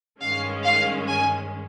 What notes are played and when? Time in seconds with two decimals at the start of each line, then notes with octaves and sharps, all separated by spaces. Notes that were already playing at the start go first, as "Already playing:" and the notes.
0.21 G2 D#3 G#3 C#4 F5
0.65 F5
1.08 G#5